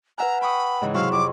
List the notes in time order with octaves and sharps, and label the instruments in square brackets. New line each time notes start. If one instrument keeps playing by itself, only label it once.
[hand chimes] B4 F#5 G#5 [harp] E5 F6 F#6 [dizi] A#5
[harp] G5 C#6 D#6 [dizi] B5
[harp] G#2 C#3 E3
[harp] C3 F#3 E4 [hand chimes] G#4 C5 C#6 [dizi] F5
[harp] F2 [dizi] D6